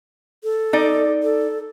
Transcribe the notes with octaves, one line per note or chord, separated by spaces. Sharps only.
A4
D#4 D5
A4